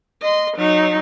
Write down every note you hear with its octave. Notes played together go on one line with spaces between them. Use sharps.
D#5 C6
F#3 D#4